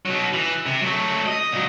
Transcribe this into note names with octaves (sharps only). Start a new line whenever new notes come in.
B2 F#3
E3
C3
F#3 A3
D#5
A#2 F#3